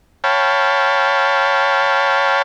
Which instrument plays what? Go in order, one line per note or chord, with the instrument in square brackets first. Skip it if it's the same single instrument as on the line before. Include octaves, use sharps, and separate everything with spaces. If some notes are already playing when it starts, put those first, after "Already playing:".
[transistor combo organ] C#5 F5 G5 A5 B5